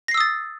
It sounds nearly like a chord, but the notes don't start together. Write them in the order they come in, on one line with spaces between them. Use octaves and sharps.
A#6 C7 E6 D#6 A6